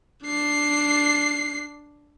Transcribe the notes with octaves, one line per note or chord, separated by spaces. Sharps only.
D4 C7